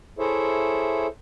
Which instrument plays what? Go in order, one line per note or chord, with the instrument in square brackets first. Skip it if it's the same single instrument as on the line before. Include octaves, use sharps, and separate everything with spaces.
[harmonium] E4 G#4 A4 C5 C#5 E5